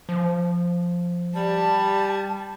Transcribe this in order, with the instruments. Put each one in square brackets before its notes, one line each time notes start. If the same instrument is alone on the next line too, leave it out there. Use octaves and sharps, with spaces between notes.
[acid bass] F3
[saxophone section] G3 [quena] A5